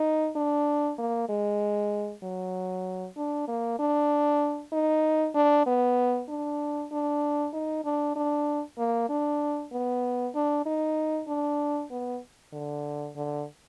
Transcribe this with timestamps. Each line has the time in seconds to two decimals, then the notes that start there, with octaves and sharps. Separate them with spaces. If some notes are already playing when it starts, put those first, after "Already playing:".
Already playing: D#4
0.35 D4
0.98 A#3
1.29 G#3
2.23 F#3
3.17 D4
3.47 A#3
3.79 D4
4.72 D#4
5.35 D4
5.66 B3
6.29 D4
6.92 D4
7.53 D#4
7.85 D4
8.16 D4
8.78 A#3
9.09 D4
9.72 B3
10.35 D4
10.66 D#4
11.28 D4
11.91 B3
12.53 D3
13.16 D3